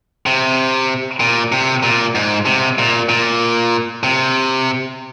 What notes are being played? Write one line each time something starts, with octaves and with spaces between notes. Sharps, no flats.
C3
A#2
C3
A#2
G#2
C3
A#2
A#2
C3